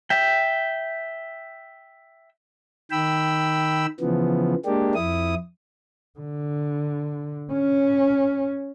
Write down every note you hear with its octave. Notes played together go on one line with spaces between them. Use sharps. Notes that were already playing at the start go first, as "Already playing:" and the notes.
E5 G5
D#3 G5 B5 E6
C#3 E3 F3 B3
G#3 A#3 D4 G4
F2 E4 D#6
D3
C#4